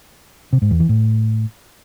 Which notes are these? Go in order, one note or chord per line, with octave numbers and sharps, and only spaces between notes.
C3
G#2
E2
E3
A2